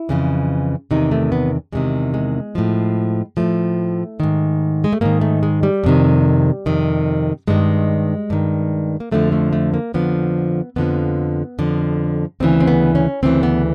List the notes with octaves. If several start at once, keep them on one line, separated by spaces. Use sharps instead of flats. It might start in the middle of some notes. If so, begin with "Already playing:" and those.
Already playing: E4
F2 C#3 E3
E2 C3 D#3 D#4
A3
B3
E2 C3 D#3 G#3
G#3
A2 F3
A2 F3 A3
G#2 D#3
G#3
A3
G#2 D#3 A#3
A3
G#3
G3
F2 C3 D#3
F2 C3 D#3
G2 D#3 G#3
G2 D#3
A#3
F2 D3 F3 A3
A3
A3
A#3
F2 D3 F3 B3
F2 D3 F3 B3
F2 D3 F3
D2 C#3 E3 C4
C4
B3
C#4
D2 C#3 E3 C4
B3